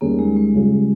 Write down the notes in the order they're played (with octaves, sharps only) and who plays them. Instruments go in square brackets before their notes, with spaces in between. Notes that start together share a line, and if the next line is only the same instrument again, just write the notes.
[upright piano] D#2 D#3 G3 C#4 G#4 [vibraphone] A#3
[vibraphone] G#3
G#3
[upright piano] C#2 C#3 G3 C#4 G#4